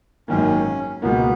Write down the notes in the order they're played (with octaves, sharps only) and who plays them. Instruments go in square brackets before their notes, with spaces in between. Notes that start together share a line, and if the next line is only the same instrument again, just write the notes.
[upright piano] G#1 F#2 D#3 A#3 [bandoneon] C#4
[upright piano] C#2 B2 A#3 [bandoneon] B3